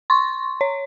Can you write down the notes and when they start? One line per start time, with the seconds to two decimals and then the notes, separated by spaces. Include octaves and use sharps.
0.10 C6 C#6
0.61 C#5